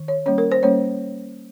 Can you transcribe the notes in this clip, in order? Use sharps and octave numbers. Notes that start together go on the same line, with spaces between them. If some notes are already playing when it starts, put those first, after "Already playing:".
Already playing: D#3
C#5
G3 A#3 C#4 C#5
A#4
C5
G3 A#3 C#4 C#5